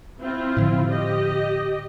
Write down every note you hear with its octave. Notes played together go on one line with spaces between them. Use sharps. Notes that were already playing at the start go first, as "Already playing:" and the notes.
C4 E4 F4
A2 D3 F3
G4 D#5